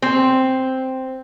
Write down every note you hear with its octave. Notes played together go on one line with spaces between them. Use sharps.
C4